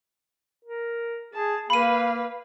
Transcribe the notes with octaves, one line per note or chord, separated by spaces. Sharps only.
A#4
G#4 A5
A#3 B4 F5 B5 D#7